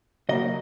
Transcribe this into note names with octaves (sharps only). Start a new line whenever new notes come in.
C#3 F#3 A#3 D#5